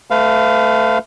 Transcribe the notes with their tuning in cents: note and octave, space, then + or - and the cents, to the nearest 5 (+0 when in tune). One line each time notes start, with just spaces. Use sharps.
A3 +0 B4 +40 F5 +0